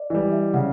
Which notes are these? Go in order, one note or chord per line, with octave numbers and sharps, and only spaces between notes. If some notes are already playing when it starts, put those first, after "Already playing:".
Already playing: D5 D#5
E3 G3 D#5
E5
C#3 F#5